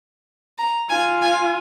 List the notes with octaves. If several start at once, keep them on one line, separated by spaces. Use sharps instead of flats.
A#5
F4 G#5
G#5